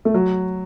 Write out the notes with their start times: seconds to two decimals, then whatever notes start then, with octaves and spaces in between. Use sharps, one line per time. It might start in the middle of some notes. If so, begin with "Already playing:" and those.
0.05 A3
0.14 F#3